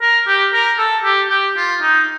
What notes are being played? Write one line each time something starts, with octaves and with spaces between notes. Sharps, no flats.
A#4
G4
A#4
A4
G4
G4
F4
D#4